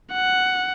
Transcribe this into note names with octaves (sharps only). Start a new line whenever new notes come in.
F#5